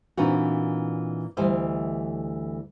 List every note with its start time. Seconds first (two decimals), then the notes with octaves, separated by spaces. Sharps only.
0.17 A#2 E3 C4 D4 D#4 F#4
1.37 D2 E3 G3 C5 D#5